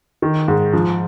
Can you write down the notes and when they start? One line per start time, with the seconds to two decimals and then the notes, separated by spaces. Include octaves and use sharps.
0.22 D#3
0.48 G#2
0.73 F3